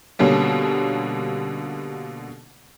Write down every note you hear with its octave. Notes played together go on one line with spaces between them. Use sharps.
B2 D3 G3 A#3 C#4